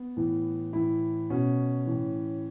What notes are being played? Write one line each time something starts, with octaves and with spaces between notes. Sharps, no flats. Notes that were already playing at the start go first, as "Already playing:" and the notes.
Already playing: B3
A2 E3
A2 E3 E4
B2 C#4
A2 E3